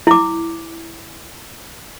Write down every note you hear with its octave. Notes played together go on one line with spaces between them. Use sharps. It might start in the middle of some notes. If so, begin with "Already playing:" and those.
E4 D6